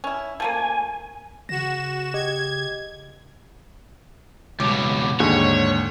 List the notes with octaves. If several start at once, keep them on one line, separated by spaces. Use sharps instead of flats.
C#4 E4
F3 A3 A#3 G#5
C#3 F#4 A#6 E7
G4 D#5 G#6
C#2 B2 D6
D#2 G#2 D3 C#5